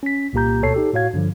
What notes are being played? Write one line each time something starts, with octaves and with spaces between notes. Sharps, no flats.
C#4 B6
C2 A#2 A#3 G4 A#5 G6
D2 B2 A4 C#5 A5 C7
D#4 G4 A4
A2 F#4 C#5 F5 G#6
G2 D3 F3